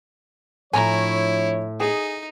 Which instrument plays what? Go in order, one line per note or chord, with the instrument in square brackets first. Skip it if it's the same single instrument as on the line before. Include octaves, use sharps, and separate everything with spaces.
[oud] A2 [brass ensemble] F3 D4 C#5 [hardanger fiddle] E4 [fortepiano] G#5 A#5
[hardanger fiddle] D#4 [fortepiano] G#4